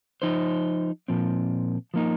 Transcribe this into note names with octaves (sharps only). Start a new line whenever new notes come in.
F3 D#4 C5
A#2 F3 C4
F3 A#3 D#4